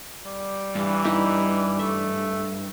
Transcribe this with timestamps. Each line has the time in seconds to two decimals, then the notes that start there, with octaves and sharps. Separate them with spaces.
0.25 G3
0.75 G2 E3
1.04 G3 D#4 E4 G4
1.79 A3 E5